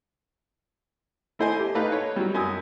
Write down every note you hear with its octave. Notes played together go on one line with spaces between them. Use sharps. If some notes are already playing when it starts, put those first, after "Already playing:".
A3 E4 C5 D#5 G#5
G4
A3 D#4 B4 D#5 F5
C#5
F#3 G3
F#2 G#5 D#6